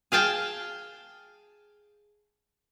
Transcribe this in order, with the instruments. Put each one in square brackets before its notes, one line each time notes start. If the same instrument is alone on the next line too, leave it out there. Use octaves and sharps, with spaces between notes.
[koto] G#4 F5 G5 A5